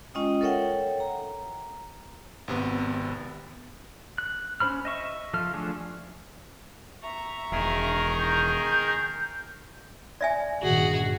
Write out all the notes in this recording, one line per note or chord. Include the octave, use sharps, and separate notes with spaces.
G#3 C#4 F4 D#5 G5 D#6
A4 A#4 C#5 E5 F#5 G5
A#5
G#1 C3 B3
F#6
C#4 F4 C5 B5 F6
D#5 E5 C#6
F3 A4 F6
F3 A3 D4 G#4
E5 A#5 C#6
E1 D#3 G#4 A#4
G6
D5 E5 G#5
G1 A#2 D#3 F#4 G#4